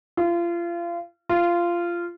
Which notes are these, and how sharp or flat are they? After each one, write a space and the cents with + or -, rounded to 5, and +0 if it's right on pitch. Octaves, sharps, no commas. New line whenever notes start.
F4 -30
F4 -15